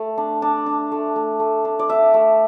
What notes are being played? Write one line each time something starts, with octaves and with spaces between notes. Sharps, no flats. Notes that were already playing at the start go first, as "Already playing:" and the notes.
Already playing: A3
D4
D4
D4
A3
A3
A3
D4
D5
D4 E5
A3